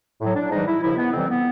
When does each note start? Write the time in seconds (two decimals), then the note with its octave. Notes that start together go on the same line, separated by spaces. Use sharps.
0.21 A2 F#3
0.35 D4
0.50 G#2 E3 G3 D#4
0.67 E4
0.81 D#2 C#3 F3 E4
0.97 B3
1.13 F2 C3 E3 G3 C4
1.28 B3